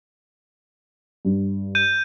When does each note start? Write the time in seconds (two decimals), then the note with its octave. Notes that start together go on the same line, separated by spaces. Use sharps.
1.25 G2
1.75 G6 D#7